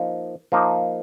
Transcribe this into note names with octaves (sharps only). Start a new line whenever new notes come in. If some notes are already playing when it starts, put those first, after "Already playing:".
Already playing: F3 A#3 D#4
F3 A#3 D#4